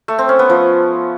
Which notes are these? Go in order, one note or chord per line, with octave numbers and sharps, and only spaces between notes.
A3
C4
C#4
B3
F3